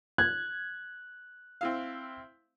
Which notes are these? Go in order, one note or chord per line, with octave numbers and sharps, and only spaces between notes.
F#6 G#6
C4 E4 F5